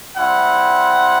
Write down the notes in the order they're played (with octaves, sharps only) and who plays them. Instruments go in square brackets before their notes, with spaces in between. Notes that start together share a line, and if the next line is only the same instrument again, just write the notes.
[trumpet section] G3 C4 E4 F#5